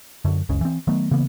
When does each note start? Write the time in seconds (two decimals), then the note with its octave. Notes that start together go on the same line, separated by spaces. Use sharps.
0.25 F#2 D3 F#3
0.49 F#1 C#2 C#3
0.61 E3 C4
0.87 D#3 F#3 A3 B3
1.11 C#3 E3 A#3 B3